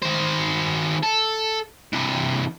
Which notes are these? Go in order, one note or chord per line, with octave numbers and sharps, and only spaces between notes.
D#3 C5
A4
C3 E3